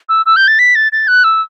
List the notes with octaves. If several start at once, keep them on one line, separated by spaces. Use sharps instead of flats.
E6
E6
G6
A6
B6
A6
A6
F#6
E6